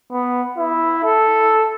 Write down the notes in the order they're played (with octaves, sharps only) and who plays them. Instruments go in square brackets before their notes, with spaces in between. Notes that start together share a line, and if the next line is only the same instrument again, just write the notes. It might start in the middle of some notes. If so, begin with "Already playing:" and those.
[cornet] B3
E4
A4